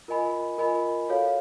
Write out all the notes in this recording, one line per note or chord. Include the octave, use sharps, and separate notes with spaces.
F4 A#4 D#5 G#5 B5
F4 A#4 D#5 G#5 B5
F#4 A4 C#5 F5